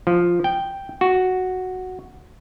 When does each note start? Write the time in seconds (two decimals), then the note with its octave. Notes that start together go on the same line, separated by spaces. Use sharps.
0.07 F3
0.44 G5
1.01 F#4